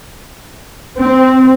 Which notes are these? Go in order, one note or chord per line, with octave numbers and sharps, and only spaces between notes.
C4